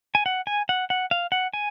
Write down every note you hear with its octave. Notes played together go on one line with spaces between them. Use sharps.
G#5
F#5
G#5
F#5
F#5
F5
F#5
G#5